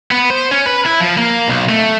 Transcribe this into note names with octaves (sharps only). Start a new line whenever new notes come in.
B3
C5
C#4
B4
E4
F3
A#3
B1
A3